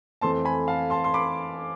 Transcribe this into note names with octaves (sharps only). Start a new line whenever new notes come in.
F2 E3 A3 C4 A5 C6
G#5 B5
F5 A5
A5 C6
C6
B5 D6